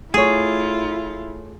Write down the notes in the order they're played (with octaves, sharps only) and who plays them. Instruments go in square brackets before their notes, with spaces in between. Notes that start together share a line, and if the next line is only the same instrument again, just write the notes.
[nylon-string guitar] A3 C#5 [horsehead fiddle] E4 [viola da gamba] F4 [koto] G#4